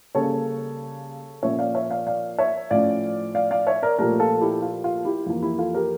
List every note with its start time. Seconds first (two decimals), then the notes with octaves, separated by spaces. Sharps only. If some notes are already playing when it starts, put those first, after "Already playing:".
0.15 C#3 G3 A#3 C#4 A4 C#5
1.43 A#2 F3 C#4 C#5 E5
1.59 D5 F5
1.75 C#5 E5
1.91 D5 F5
2.07 D5 F5
2.38 C#5 E5
2.70 A2 F3 C#4 D5 F5
3.35 D5 F5
3.51 D5 F5
3.67 C#5 E5
3.83 A#4 D5
3.99 A#2 F3 A3 G4 A#4
4.20 F4 A4
4.41 E4 G4
4.62 F4
4.84 F4
5.05 E4 G4
5.26 F2 E3 A#3 F4
5.42 E4 G4
5.59 F4 A4
5.74 G4 A#4